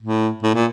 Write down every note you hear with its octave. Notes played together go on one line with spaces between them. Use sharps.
A2
A2
A#2